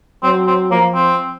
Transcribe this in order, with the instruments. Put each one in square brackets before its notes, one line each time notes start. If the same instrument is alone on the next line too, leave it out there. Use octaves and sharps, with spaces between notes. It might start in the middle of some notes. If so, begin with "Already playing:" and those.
[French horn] F#3 [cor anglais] C4
[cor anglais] C4
[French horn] F3 [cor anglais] A#3
[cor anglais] C4